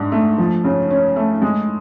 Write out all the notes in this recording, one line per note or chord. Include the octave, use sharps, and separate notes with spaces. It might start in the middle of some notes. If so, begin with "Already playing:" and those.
Already playing: G#2 D4
A3
F3
C#3
C#4
A3
G#3